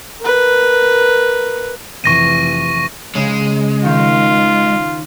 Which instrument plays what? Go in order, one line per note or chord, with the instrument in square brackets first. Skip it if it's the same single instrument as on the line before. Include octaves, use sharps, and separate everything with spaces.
[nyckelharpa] A#4 B4
[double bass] F1 E3 [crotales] C#6 A#6 D#7
[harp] C#3 [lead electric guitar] G#3
[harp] D#3 [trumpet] F4